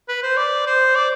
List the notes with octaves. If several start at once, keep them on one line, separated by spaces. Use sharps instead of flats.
B4
C5
D5
C5
D5